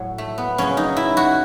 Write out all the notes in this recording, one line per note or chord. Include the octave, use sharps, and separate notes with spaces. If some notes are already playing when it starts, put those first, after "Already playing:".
Already playing: A2 F#3
A3
B3
F#2 C#3 F#3 C#4
D#4
E4
F#4